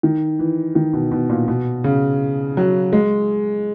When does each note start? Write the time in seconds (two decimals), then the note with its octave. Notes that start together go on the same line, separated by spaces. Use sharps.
0.03 D#3
0.39 E3
0.75 D#3
0.93 B2
1.12 B2
1.29 A#2
1.48 B2
1.84 C#3
2.57 F#3
2.93 G#3